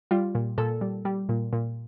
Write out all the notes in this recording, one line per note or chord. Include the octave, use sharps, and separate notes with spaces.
G3 F4
A#2
A#2 A4
G3
G3
A#2
A#2